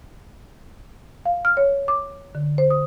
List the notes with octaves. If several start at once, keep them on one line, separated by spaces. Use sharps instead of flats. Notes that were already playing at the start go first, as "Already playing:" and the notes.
F5
F6
C#5
D6
D3
C5
D#6